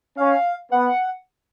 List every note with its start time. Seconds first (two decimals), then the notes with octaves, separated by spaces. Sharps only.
0.17 C#4 F5
0.71 B3 F#5